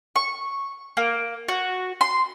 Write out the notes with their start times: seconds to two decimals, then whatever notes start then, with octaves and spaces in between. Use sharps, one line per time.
0.16 C#6
0.97 A#3
1.48 F#4
2.01 C6